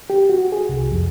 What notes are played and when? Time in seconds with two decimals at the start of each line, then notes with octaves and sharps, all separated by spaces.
0.10 G4
0.29 F#4
0.52 G#4
0.69 C2
0.92 F2